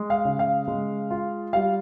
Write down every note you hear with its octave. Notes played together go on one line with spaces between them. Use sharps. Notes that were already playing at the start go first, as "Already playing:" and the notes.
Already playing: G#3
F5
C#3
F5
G#3
F4
G3 F5